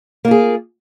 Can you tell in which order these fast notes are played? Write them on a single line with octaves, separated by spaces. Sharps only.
A#3 F4 G#4